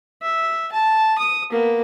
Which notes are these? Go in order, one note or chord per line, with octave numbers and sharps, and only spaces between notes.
E5
A5
D#6
A#3 B3